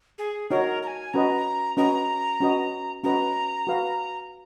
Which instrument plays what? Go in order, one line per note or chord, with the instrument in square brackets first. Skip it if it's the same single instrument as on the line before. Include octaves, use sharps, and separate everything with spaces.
[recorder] G#4
[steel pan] D#4 F#4 C#5 [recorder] A#4
[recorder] A#5
G#5
[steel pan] C#4 F#4 B4 D#5 [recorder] A#5
[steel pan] C#4 F#4 B4 D#5 [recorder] A#5
[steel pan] C#4 F#4 B4 D#5
[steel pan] C#4 F#4 B4 D#5 [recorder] A#5
[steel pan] F#4 B4 F5